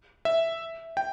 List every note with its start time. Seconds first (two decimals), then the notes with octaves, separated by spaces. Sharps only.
0.25 E5
0.97 G5